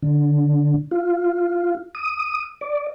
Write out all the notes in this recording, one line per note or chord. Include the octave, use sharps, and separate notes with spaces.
D3
F4
D#6
D5